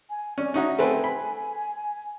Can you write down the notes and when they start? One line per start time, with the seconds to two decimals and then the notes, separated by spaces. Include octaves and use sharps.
0.09 G#5
0.38 C#4 D5
0.54 C#4 D#4 F#4 E5
0.79 A3 C4 B4 G#5
1.04 B5